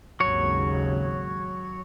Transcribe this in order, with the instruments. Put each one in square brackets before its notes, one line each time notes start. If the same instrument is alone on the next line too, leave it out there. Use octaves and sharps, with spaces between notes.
[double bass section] G#1 D#2 C#3 [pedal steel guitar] F#3 C#5